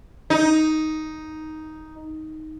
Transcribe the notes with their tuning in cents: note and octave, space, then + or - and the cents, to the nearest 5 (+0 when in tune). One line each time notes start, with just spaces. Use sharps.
D#4 +5